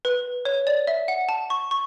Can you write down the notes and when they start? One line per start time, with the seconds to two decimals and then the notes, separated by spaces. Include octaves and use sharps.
0.05 B4
0.45 C#5
0.67 D5
0.87 E5
1.08 F#5
1.29 A5
1.50 C#6
1.71 C#6